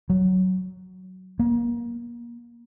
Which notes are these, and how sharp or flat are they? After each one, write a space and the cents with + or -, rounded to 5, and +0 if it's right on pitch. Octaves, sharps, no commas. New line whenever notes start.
F#3 +10
A#3 +25